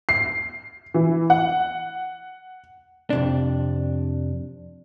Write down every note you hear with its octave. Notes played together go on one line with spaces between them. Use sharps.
C7
E3
F#5
F2 C3 D4